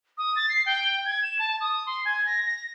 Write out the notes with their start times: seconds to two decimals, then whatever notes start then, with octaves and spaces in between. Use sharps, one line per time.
0.18 D#6
0.36 A6
0.49 C7
0.66 G5
1.05 G#6
1.23 E7
1.39 A5
1.60 D#6
1.86 C6
2.05 G#5
2.26 A#6
2.46 A#6